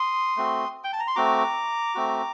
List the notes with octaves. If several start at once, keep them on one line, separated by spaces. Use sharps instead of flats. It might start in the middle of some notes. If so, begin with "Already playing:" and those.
Already playing: C6 D#6
A3 C4 F#4
G5
A5
A#5
C6
A3 C4 F#4 A#5 D6
A3 C4 F#4